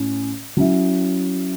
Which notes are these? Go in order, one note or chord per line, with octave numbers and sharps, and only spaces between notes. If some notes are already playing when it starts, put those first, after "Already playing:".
Already playing: A2 C#4
F#3 C#4 E4